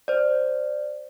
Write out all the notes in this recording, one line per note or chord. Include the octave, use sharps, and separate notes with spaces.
C5 D5